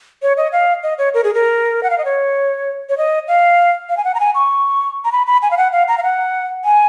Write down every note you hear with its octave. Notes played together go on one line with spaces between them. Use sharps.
C#5
D#5
F5
D#5
C#5
A#4
G#4
A#4
F#5
F5
D#5
C#5
C#5
D#5
F5
F5
G#5
F#5
A#5
G#5
C#6
A#5
B5
B5
G#5
F5
F#5
F5
A#5
F5
F#5
G#5